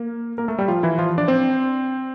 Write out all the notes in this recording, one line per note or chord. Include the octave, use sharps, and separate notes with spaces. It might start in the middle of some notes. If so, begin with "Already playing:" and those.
Already playing: A#3 A#4
A#3 A#4
A3 A4
G3 G4
F3 F4
E3 E4
F3 F4
D4 D5
C4 C5